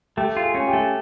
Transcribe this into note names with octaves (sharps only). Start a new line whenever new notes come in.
A3 G4
F4
G#4
C#4
G4
A3